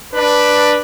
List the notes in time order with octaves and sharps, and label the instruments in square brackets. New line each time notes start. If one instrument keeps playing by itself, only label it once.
[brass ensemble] D4 B4